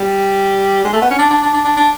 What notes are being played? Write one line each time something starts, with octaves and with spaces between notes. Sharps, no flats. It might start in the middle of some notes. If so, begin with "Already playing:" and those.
Already playing: G3
G#3
A3
B3
C#4
D4
D4
D4
D4
D4
D4